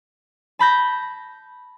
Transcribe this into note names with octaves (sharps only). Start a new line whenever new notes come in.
A5 B5 G6 A#6